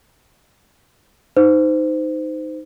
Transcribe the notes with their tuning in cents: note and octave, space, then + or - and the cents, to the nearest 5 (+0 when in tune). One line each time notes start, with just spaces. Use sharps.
D#4 +0 C5 -25